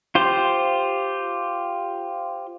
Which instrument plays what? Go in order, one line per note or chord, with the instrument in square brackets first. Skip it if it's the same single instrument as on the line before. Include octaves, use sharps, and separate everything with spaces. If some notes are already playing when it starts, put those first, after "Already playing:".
[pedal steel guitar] F4 G4 C5